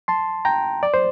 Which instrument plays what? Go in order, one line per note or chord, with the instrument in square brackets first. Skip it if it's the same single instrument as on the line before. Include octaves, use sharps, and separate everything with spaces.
[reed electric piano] A5 C6
G5 A#5
D5
C5